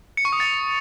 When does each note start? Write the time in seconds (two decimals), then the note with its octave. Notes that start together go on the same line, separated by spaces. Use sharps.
0.17 C#7
0.25 C#6
0.33 D#6
0.40 A6